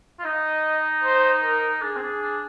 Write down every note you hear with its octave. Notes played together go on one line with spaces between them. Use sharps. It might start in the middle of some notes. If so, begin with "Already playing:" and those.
F4
D#4 D#5
C5
A#4
D4 G#4
C4
D4
D4